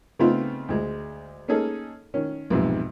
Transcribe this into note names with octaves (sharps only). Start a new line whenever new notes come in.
C#3 A3 B3 C4 D#4 F4
D2 G#3
A#3 C#4 D#4 G#4 A4
D#3 C#4
B1 F2 G#2 C3